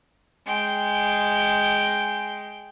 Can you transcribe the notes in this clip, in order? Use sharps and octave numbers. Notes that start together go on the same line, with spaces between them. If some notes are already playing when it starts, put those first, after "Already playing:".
G#3 G5